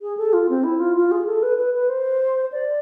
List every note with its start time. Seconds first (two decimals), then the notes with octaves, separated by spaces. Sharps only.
0.02 G#4
0.17 A4
0.33 F4
0.49 C4
0.64 E4
0.80 F4
0.96 F4
1.11 G#4
1.26 A4
1.43 B4
1.58 B4
1.74 B4
1.89 C5
2.52 D5